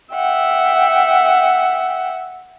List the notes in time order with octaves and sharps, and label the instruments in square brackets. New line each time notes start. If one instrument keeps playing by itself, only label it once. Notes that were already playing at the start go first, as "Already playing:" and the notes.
[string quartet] E5 F#5 G5